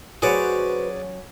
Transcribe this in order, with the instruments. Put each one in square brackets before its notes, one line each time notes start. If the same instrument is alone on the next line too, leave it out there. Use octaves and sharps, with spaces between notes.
[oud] F#3 C#4 [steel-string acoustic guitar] F#4 B4 C5 [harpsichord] G#4 D5